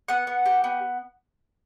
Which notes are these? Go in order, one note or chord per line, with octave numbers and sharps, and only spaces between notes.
B3 F#5
B3
G4
B3